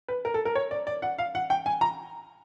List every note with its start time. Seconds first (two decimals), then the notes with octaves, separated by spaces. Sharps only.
0.08 B4
0.25 A#4
0.34 A4
0.45 A#4
0.55 C#5
0.71 D5
0.87 D5
1.02 F#5
1.18 F5
1.35 F#5
1.50 G5
1.66 G#5
1.81 A#5